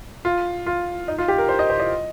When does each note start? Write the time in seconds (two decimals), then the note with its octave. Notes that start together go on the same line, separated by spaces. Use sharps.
0.25 F4
0.66 F4
1.08 D#4
1.18 F4
1.28 G4
1.38 A#4
1.49 C5
1.59 D#5
1.70 C5
1.80 D#5